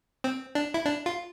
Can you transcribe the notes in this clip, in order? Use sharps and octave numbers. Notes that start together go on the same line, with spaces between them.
C4
D4
E4
D4
F4